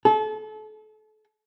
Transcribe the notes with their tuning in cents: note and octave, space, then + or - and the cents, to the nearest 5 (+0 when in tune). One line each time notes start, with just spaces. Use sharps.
A4 -35